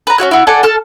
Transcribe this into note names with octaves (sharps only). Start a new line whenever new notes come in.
B4 A#5
C#4 E4 F#4 F#6
E4 F#4
A4 D5 F#5 G#5
A4 A5 F6